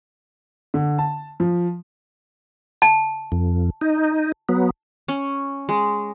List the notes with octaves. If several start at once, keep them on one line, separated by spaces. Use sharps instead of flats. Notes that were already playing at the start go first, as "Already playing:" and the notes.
D3
A5
F3
A5
F2
D#4
F#3 B3
C#4
G#3